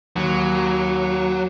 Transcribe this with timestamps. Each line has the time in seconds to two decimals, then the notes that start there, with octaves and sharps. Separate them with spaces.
0.16 D#2 F#3